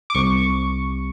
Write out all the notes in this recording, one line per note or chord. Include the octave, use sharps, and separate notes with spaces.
D6
C2 C#6